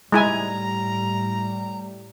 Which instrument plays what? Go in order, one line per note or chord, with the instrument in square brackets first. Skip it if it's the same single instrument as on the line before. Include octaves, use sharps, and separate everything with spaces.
[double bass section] A2 G3 [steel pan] G#3 E4 G#5 [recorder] A#5